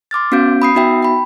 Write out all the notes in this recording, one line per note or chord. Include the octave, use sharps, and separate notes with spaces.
C6 D6 F6 A6
B3 C#4 F#4 F5 G6 D7
B5 D#6 C7
B3 D#4 F#4 E5 G5
G5 B5